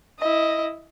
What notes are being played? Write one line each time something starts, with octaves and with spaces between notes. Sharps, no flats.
E4 D#5